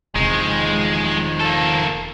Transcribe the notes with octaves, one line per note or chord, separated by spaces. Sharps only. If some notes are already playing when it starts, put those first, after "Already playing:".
E1 C3 D#3 F3 G#3
A#3 A4